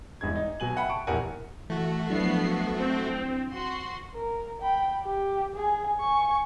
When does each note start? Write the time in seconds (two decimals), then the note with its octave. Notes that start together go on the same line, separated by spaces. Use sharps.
0.21 E2 G2 G#3 G#6
0.36 D#4
0.60 B2 F#3 G#5 F#7
0.76 E5 F#5 G5 B5
0.89 A5 C#6 D7
1.07 A#1 E2 G4 A#4 F#5 G#5
1.70 E3 A3 F#4
2.10 F3 F#3 B3 D4 E4 C7
2.76 C4
3.52 F#4 C6
4.15 A#4
4.62 G5 B5
5.03 G4
5.55 G#4 G#5
6.00 G#5 C#6